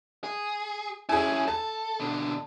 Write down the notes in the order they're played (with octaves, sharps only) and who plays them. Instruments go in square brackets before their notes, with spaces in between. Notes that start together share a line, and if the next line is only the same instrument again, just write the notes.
[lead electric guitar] G#4
[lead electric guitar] C#4 E4 [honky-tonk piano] G#4 G#5
[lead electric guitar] A4 [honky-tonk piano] A5
[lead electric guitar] B2 D3